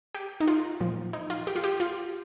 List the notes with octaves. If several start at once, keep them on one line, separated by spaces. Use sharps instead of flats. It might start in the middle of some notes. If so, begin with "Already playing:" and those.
G4
D#4
F4
A#2 F3
D#4
F4
G4
F4
G4
F4